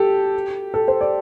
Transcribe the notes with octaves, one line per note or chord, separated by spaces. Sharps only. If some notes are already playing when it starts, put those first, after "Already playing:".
Already playing: G4 A4
A4
C5
D5